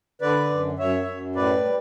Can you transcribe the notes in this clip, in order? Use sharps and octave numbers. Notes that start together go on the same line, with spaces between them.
D3 B4 D5
F#2
F#2 C#5 E5
F#2
A2 B4 D5
G3